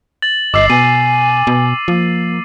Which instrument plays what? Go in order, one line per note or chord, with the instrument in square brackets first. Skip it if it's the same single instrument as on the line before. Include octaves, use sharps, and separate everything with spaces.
[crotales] A6 F#7
[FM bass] G1 [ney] D#5 [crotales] D6 E6 C7
[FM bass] B2 [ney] G#5 [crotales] D#7
[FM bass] B2
[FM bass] F3 [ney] A#3